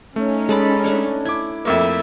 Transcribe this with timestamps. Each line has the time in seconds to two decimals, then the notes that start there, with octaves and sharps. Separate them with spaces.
0.16 A3 C#4 D#4
0.49 G#3 A4 D5 B5
0.84 A3 D4 C#5
1.25 E4 D6 G#6
1.65 F2 A3 A#3 E5